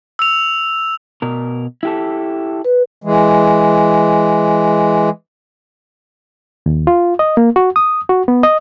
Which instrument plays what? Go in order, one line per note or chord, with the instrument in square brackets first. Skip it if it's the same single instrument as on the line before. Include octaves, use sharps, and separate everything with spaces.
[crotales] E6 F7
[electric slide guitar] B2 A#4
E4 G4 A4
[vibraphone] B4
[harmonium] E3 G#3
[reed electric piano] D#2
F4
D#5
A#3
F#4
D#6
F#4
B3
D#5